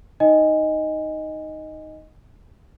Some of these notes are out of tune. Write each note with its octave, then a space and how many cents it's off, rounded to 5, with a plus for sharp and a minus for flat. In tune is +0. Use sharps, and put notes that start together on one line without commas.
D#4 +0 D#5 +0 G#5 -20